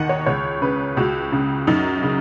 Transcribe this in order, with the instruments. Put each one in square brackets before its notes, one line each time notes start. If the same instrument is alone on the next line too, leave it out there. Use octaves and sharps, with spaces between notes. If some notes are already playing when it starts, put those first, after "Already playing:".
Already playing: [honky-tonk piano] D#2 D#3 D#5 F#5
C#5
C#2 C#5
C#3 B4
C#2 F#4
C#3
F#2 D#4
C#3